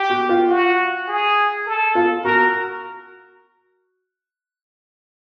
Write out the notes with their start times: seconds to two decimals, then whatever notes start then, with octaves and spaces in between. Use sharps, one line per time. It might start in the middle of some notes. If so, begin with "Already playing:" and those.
Already playing: G4
0.10 F#4
0.29 F4
0.49 F#4
1.08 G#4
1.66 A4
1.95 F4
2.24 F#4 A#4